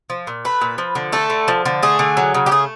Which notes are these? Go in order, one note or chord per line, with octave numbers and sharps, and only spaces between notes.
F3
A#2
A3 B4
A#2
F3
D3
A3 A4
D3
F3
D3
A3 G#4
D3
F#3
C#3
G4
A3 G#4